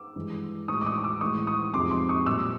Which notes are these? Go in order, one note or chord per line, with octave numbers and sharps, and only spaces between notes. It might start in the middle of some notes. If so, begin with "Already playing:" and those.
Already playing: D6 E6
G2 E3 G#3
A2 E3 G#3 C#6 D#6
D6
C#6 D#6
D6 E6
A2 E3 G#3 C#6 D#6
C#6 D#6
F2 C3 F3 G#3 C6 D6
C6 D6
C#6 D#6
A#2 G3 D6 E6